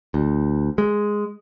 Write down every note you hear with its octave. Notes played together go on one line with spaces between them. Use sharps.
D2
G#3